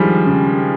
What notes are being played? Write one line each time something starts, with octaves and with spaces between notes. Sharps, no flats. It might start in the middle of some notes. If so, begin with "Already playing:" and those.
Already playing: D#3 F3 G3 G#3
C#3